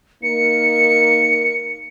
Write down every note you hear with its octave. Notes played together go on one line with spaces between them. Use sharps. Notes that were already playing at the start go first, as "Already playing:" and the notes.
A#3 D#4 A#4 C#7